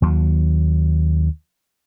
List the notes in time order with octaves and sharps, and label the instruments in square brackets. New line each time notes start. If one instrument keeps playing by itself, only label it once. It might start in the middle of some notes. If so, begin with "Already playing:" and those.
[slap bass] D#2 F#3